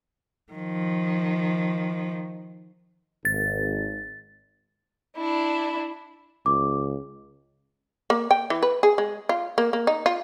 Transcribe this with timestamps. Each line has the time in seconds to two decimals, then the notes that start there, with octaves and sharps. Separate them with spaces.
0.52 D#3 F3
3.25 G#1 A6
5.17 D4 E4
6.46 C#2 D6
8.10 A#3
8.31 G5
8.50 E3
8.63 B4
8.83 G#4
8.98 G#3
9.29 F4
9.58 A#3
9.73 A#3
9.87 D#4
10.06 F4